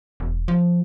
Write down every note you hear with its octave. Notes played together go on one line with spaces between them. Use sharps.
E1
F3